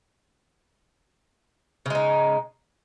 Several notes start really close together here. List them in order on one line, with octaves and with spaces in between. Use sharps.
C#3 G#3 D#4